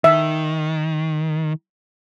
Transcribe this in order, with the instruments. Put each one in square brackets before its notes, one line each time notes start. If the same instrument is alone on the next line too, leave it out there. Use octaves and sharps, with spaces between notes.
[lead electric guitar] D#3 [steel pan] E5